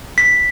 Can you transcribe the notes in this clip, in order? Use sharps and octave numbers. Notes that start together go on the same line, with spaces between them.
B6